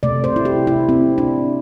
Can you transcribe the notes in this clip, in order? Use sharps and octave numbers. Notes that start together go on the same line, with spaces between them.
C3 A3 D5
C5
E4
G4
E4
C4
D4